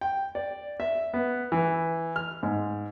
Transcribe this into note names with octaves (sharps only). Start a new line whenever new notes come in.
G5
D5
E5
B3
E3
F6
G#2